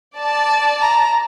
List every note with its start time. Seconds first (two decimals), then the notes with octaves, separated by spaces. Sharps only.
0.16 D5 A5
0.82 A#5